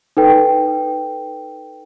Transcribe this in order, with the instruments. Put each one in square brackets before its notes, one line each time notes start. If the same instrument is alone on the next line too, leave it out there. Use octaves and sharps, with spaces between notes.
[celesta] D#4 A4 B4 G5